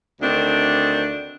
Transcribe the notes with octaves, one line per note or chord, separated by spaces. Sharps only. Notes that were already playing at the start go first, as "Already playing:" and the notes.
D2 D#3 C4 D4